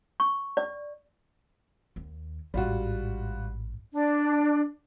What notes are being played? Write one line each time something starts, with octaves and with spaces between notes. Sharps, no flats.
C#6
D5
D#2
A1 G#2 G3 F4 F#4
D4